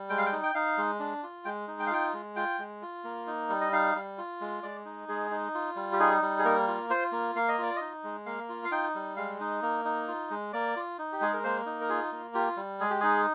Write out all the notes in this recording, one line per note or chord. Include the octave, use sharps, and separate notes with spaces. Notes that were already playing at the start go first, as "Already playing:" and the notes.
Already playing: G3
G#3 G5
F5
G5
D#4
G5
D#4 F5
G#3
D4
F4
G#3 G5
D#4
G5
F5
F4 G5
G#3
F4 G5
G#3
F4
A#3
D#4
G3
D#5
D#4 F5
G3
F4
G#3
G#3 D5
D#4
G#3 G#4
D#4
F4
G3
G4
D#4 G#4
G3
G#4
A#3 A#4
F4
F4 C5
A#3
A#3 F5
D#5
F4 D5
D#4 D#5
G#3
A#3 F5
F4
F5
D#4 G5
G3
G#3 F5
D#4
A#3
D#4
F4
G#3
A#3 D5
F4
D#4
G4
G#3 G#4
A#4
A#3 C5
D#4
A#4
F4 G#4
A#3
F4 G4
G3
G#3 G#4
G4
D#4 G#4